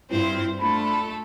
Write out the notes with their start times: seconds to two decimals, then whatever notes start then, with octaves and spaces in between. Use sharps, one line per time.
0.11 G2 C4 E4 F4 C5
0.60 A3 D4 F4 A4 B5